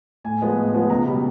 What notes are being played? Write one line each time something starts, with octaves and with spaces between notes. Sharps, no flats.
A2 G#5
F3 G#3 B3
A2
F3 G#3 B3
C#2 A#5
B2 G3 B5